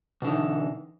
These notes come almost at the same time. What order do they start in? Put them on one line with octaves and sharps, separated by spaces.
B2 D3 D#4 E3